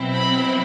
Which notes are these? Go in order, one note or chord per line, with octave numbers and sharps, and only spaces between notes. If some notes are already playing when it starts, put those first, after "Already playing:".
Already playing: B2 F#3 C4 E4
B5